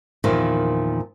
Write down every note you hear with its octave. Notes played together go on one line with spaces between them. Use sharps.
E2 A#2 D#3 F3